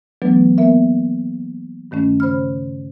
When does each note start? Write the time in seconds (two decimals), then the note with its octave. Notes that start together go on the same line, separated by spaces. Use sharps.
0.22 E3 F#3 A3 B3 D4 B4
0.58 A#3 B3 A#4 E5
1.91 G2 D#3 A3 C#4
2.20 C#3 C5 B5 F6